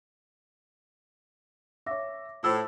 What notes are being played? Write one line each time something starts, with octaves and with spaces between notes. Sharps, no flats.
C#5 E5 D6 A#6
A2 F4 C5 E6 A6